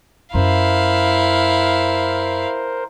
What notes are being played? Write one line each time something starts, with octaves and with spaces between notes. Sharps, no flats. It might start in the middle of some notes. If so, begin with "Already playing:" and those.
F#2 G#3 E4 A#4 C5 F5